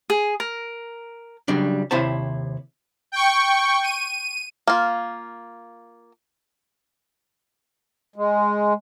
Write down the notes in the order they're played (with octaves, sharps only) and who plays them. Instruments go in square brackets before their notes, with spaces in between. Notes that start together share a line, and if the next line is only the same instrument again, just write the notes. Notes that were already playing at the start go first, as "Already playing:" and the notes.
[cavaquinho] G#4
A#4
[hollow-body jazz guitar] C#3 F#3 G3 D4
D#2 C3 E4 C5 C#5 A5
[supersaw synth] G5 C#6
D#7
[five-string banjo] A#3 F4
[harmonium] G#3